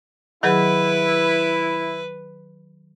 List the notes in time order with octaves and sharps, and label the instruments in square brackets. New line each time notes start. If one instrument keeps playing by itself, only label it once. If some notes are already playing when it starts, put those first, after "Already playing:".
[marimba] D#3 F#3 G#4 [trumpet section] E4 [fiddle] B4